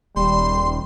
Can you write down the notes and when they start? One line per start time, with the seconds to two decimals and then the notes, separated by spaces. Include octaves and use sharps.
0.16 D#1 G3 C6